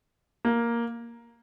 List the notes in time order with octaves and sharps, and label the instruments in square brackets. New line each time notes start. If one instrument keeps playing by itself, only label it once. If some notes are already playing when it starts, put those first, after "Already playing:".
[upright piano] A#3